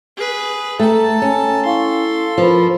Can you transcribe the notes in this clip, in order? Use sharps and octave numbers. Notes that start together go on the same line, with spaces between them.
G#4 B4
A3 A4 G5 A5 A#5
C#4
E4 A4 F5 C6 C#6
F3 A#4 B4 B5